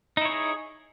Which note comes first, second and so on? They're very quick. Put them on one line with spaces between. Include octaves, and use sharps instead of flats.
D#4 E4 C#5 G#4